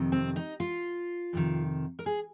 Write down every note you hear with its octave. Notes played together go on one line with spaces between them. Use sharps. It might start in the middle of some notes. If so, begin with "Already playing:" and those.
Already playing: F2 C3 D#3
C4
D#4
F4
F2 C3 D#3
A#4
G#4